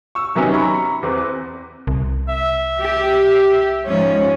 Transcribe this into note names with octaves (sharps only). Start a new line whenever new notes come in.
C#6 E6
C3 F#3 B3 C#4 D#4
A#5 B5 C#6
E2 C4 B4
C2
E5
G4
G#2 F3 C#4